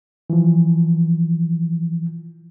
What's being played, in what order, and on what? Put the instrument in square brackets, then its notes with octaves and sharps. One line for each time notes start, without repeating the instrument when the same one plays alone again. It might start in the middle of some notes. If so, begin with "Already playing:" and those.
[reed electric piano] E3 F3